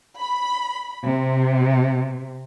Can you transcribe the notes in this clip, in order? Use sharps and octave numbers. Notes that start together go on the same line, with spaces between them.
B5
C3